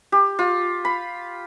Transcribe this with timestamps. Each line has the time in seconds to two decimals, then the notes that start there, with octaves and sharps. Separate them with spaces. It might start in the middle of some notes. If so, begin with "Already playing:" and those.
0.12 G4
0.39 F4
0.85 B5